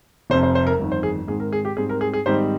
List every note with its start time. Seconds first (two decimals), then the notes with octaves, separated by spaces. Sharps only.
0.30 F1 F2 C3 C5
0.43 C5
0.55 C5
0.67 A#4
0.79 G1 F2 D#3
0.92 C5
1.03 G#4
1.28 G#2 D#3 G#3 C4 G#4
1.40 A#4
1.53 G#4
1.65 G4
1.77 G#2 G3 C4 G#4
1.89 A#4
2.01 G#4
2.13 G#4
2.26 G#2 D#3 G3 C4 D#4 C5